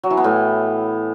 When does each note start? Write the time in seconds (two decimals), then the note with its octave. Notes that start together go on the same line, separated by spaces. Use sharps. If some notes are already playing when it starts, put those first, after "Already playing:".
0.03 F#3
0.10 E3
0.17 B3
0.24 A2